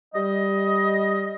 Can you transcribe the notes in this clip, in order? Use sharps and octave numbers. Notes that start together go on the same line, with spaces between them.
G3 D#5